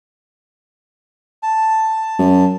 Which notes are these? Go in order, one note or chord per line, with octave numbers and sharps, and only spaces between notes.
A5
F#2